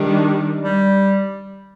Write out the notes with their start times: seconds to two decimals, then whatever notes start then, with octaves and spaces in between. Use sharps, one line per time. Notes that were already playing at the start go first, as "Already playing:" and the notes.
Already playing: D#3 G3 D4
0.62 G3